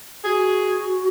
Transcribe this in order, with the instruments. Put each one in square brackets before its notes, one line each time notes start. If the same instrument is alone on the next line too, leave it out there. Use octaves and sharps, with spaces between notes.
[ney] F#4 [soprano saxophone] G#4